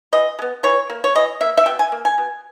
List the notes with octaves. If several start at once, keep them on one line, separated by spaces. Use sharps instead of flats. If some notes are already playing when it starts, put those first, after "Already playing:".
E3 D#5
G#3
B3
E3 C#5
A#3
C#5
E3 D#5
A#3 E5
E5
B2 G5
G#5
A#3
G#5
B2